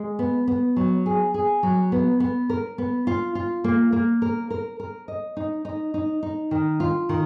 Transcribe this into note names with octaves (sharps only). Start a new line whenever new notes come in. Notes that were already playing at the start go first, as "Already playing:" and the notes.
Already playing: G#3
B3
B3
F#3
G#4
G#4
F#3
B3
B3
A#4
B3
F4
F4
A#3
A#3
A#4
A#4
A#4
D#5
D#4
D#4
D#4
D#4
D#3
F4
D#3